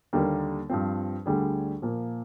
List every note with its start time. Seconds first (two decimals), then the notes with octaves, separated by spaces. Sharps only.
0.13 D#2 D3 G3 A#3
0.69 G2 F3 C4
1.26 D2 D3 G3 D4 G#4
1.82 A#2 F3 A#3